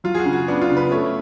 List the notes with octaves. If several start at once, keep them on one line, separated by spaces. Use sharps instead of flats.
F#3 F4
G#4
F#4
C#3
F#4
B3 D4
F4
C#3
B4
A3 C#5